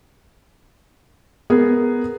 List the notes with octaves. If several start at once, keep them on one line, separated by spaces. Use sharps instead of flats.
B3 G#4 A#4